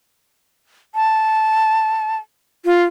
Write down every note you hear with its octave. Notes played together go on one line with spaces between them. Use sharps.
A5
F4